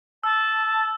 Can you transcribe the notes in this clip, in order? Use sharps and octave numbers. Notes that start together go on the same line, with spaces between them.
A5 E6